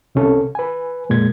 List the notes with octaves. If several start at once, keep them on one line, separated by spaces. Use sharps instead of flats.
C2 C3 C#4 A4
B4 G#5
F2 A#2 G#3 G#6